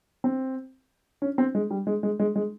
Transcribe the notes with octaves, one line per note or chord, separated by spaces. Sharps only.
C4
C#4
C4
G#3
G3
G#3
G#3
G#3
G#3